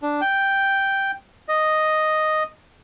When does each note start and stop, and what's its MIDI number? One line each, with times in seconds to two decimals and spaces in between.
0.02 0.21 62
0.21 1.11 79
1.48 2.43 75